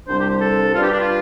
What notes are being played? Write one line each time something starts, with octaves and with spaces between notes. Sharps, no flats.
C2 C3 G3 D4 C5
G4
C5
A4
G2 G3 D4 F4
G4
D4
F4